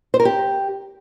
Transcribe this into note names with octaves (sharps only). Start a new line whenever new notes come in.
C5
A#4
G4